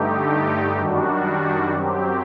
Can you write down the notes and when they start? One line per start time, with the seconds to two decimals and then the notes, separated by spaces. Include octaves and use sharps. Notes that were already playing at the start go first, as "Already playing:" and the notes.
Already playing: G2 D3 A3 D#4 G4
0.78 F#2 D#3 G3 D4 F#4
1.72 F#2 F#3 C4 G4